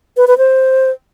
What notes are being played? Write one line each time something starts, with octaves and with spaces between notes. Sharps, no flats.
B4
B4
C5